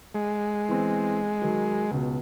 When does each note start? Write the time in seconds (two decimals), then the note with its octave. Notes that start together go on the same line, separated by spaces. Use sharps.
0.15 G#3
0.69 E3 B3 C4
1.42 D#3 F#3
1.91 C#2 B2